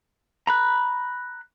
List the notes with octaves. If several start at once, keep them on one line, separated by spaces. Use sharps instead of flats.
A#5 B5 F#6